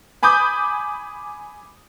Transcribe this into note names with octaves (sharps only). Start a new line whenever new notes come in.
G#5 B5 D6 D#6 G6